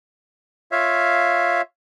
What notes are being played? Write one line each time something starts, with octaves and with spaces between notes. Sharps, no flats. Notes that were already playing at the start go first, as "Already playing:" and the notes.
F4 C#5 E5 F5